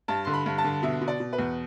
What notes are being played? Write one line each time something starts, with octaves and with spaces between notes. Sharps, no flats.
G2 A5
D3 C6
B5
G2
A5
D3
B2 E5
B2
D5
B2
B4
E2